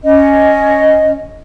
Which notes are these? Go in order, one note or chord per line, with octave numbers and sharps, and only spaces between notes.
C#4 D#5